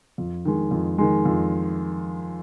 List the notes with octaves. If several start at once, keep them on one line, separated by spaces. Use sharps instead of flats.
F2
D#3 G#3
F2
D#3 G#3
F2